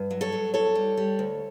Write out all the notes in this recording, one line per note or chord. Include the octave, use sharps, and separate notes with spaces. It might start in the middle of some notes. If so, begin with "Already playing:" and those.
Already playing: G2
F#3
A4 C#5
F#3
E2 A4 C#5
G3
G3
D2